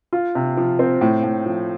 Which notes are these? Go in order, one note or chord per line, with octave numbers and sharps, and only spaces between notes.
F4
C3
F3
C4
A2
A2
F3